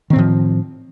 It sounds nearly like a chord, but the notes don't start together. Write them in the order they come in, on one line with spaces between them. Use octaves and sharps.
D#3 C4 A2 F3